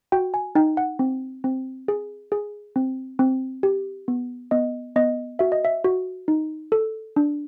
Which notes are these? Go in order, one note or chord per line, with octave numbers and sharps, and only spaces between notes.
F#4 G5
G#5
D#4 G5
F#5
C4
C4
G#4
G#4
C4
C4
G4
B3
B3 D#5
B3 D#5
F#4 E5
D#5
E5
F#4
D#4
A4
D4